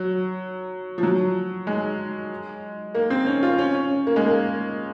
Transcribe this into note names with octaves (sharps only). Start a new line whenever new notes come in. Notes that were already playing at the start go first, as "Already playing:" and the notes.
Already playing: F#3
F3
F#3
G#3
A#3
C4
C#4
F4
C#4
C#4
A#3
G#3
A#3